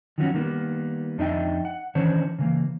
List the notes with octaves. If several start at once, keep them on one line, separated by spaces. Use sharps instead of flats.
D#3 F3 F#3 B3 C#4 F#4
D#3 G3 A#3 B3
F2 D4 D#4 D#5 E5 G5
F#5
D#3 E3 C#4 D4 C5 C#5
C#3 E3 A#3